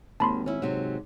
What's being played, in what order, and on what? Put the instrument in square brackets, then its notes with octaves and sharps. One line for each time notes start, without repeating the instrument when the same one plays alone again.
[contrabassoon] G#1 [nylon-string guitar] D#2 [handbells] A5 B5 C6
[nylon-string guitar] C#4 E4
[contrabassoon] G#2 [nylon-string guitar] C3 F#3